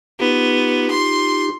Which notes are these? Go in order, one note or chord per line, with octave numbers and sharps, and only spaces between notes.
B3 D#4 F4 G4
C6